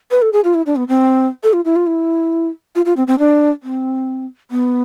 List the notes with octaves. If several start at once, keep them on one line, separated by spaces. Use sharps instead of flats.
B4
A4
G#4
F4
E4
D4
B3
C4
A4
F4
E4
F4
E4
F4
F4
C4
C4
D4
C4
B3